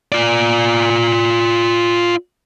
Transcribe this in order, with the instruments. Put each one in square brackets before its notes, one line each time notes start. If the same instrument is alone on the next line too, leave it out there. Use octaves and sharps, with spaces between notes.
[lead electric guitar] F4 D5